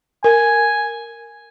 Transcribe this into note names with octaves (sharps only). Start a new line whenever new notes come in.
A#4 G#5